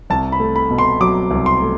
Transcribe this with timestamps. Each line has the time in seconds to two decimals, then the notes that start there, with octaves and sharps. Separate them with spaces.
0.10 C2 A5
0.32 B5
0.40 A3
0.56 B5
0.70 B2
0.78 C6
1.00 F#3 D6
1.31 C2
1.46 C6
1.62 A3